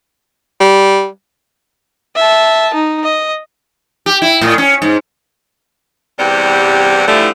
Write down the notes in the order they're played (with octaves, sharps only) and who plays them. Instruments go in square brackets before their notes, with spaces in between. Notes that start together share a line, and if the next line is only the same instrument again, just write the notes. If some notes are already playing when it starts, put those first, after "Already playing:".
[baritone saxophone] G3
[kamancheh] E5 A5
D#4
D#5
[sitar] G4
E4
A2
C#4
G#2
[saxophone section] E2 C3 E3 G3 G4 F#5
D3 E3 F3 G3 A3 E4